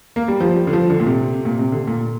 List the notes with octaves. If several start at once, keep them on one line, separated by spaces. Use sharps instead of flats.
A#3
G3
F3
G3
D3
F3
D3
A#2
C3
A#2
C3
D3
A#2